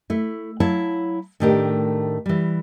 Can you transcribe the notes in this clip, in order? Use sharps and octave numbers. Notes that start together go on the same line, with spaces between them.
A3 E4
F#3 E4 C#5 F5 A5
A2 D#3 A3 D4 G4 A#4
E3 G3